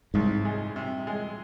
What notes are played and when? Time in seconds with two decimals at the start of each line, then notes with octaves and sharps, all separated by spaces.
0.14 C2 G#2
0.45 G#3
0.76 C3
1.07 G#3